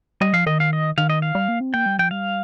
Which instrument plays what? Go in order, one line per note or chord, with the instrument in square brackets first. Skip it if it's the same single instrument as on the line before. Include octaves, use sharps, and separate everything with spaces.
[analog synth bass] G3 [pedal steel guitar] D#5
[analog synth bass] F3 [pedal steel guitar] F5
[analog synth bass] D#3 [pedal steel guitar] D#5
[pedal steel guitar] F5
D#5
[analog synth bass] D#3 [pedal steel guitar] F5
[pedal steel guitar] D#5
F5
[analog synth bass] G3
A#3
C4
[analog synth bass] A#3 [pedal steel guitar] G5
[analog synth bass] G3
[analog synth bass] F3 [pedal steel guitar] G5
[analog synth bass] G3 [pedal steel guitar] F5